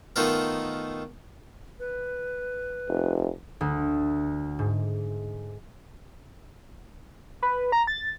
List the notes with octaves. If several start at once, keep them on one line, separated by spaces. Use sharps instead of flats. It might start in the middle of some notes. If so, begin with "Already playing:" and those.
D#3 A3 B3 D#4 F4 A#4
B4
F1
D2
G#2
B4
A#5
A6